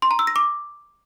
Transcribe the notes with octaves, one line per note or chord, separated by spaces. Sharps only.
C6
A#5
E6
A#6
D6